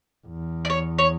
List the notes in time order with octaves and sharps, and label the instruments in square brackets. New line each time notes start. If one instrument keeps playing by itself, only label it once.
[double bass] E2
[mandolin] D5
C#5
C#5